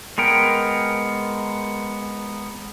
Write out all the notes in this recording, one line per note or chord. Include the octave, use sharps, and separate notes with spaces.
G#3 B3 A#4 G5